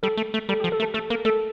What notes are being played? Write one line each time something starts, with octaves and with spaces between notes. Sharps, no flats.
G3 A4
A3
A3
G3 A4
F3 G4
A4
A3
A4
A3 A4
A#3 A#4
A3 A4